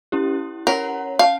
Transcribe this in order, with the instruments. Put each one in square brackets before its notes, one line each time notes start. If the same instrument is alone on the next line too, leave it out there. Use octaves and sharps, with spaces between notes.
[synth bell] C#4 E4 G4
[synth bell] C#4 C#5 F#5 [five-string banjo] A#4
[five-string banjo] F5 [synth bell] A5